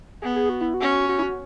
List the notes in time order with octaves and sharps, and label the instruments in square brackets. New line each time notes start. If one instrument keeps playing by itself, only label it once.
[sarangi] B3 [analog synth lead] G#4
[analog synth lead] G#4
F#4
E4
F#4
[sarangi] C#4
[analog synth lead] F#4
E4
F#4